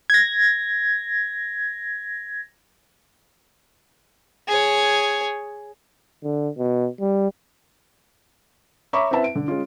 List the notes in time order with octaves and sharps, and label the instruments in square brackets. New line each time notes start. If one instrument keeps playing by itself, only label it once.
[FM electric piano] G#6 A#6
[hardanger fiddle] G#4 C#5
[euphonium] D3
B2
G3
[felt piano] C#5 E5 A#5 B5 C#6 D6
C4 E4 B4 E5 A5
D7
D3
G#3 C#4 F4